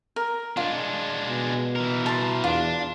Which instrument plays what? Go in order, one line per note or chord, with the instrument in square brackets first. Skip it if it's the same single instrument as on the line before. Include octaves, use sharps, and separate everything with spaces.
[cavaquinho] A#4
[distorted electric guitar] G#3 D4 [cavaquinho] F4
[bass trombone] B2
[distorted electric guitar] E3 A#4
[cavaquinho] A5 C6
[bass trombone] E2 [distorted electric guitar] D4 [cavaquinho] F4